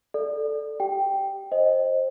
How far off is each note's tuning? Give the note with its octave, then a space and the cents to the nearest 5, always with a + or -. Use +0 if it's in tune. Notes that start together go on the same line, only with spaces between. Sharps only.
A4 +0 D5 +0
G4 +0 G5 +0
C5 +20 D#5 +0